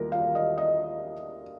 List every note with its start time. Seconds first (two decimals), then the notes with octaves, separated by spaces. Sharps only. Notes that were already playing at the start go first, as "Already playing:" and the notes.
Already playing: D#2 D#3 G3 A#4
0.12 F5
0.35 D#5
0.58 D#5